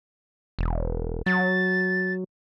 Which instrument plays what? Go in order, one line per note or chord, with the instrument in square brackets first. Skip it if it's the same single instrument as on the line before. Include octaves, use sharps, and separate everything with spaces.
[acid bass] E1
[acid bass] F#3 [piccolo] A6